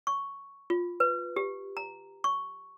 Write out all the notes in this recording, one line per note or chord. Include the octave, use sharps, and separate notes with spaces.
C#6
F4
B4
G4
A#5
C#6